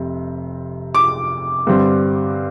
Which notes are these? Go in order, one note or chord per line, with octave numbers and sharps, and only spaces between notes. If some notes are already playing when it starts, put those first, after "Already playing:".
Already playing: F1 C3
D6
G2 D3 G3 C4